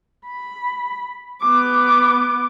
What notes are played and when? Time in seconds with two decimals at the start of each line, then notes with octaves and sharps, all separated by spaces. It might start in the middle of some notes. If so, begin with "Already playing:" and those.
0.28 B5
1.41 B3 D6